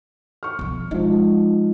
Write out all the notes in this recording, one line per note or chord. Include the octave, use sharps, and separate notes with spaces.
C#6 F6
B1 F3
F3 G#3 D#4